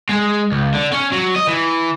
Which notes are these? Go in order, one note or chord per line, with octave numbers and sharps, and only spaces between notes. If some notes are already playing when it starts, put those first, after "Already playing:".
G#3
C#2
D3
C#4
F#3
D#5
E3